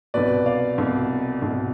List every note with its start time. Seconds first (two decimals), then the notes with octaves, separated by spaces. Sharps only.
0.14 C2 B2 B4 D5
0.46 D5 F5
0.78 C2 B2
1.42 C2 B2